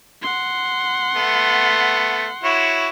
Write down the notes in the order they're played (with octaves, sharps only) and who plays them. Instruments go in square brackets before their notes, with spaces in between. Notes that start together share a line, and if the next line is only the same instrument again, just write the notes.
[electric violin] F#5 C6
[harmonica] A3 B3
E4 F#4 C#5